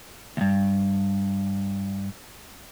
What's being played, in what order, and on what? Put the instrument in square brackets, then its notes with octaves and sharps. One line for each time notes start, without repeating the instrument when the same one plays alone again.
[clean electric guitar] D2 G2